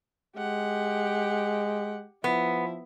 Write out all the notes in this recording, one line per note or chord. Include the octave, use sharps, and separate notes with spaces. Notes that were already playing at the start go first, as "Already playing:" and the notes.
G#3 G4 F#5
F3 B3 E4